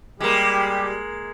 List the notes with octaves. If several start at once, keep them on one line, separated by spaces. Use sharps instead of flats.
G3 G#3 A#3 G4